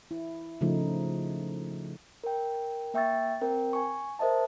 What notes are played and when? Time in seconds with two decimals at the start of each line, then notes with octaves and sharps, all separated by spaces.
0.11 E4
0.61 C#3 F3 A3 D#4
2.24 A#4 G5
2.94 A#3 E5 G5 C#6 E6 A6
3.41 C4 A#4 G5
3.73 G#5 C#6
4.19 A#4 C5 D#5 E5 A5